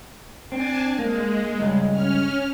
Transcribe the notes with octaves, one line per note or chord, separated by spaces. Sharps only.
C4 D4 G#5 A5
G#3 A#3
C#2 G2 G#3
C#4 F6